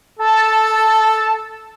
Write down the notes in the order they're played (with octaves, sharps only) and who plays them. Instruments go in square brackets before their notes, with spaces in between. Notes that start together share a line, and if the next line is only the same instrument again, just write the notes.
[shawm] A4 [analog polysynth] A5